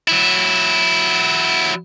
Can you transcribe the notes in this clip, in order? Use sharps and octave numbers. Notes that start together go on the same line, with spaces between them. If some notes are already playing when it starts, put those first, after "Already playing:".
F#3 E4